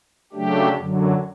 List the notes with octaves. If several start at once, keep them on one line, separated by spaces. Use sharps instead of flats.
C#3 F#3 A3 D4 G4
F#2 D3 F#3